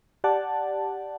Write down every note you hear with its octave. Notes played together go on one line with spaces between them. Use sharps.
G4 D5 F#5 A5